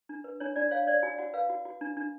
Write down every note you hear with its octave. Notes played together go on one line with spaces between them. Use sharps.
D4
B4
D4 C#5
D4 D5
C#5 F5
C#5 D5
F#4 G#5
F#4 F#5
B4 F5
F#4
F#4
D4
D4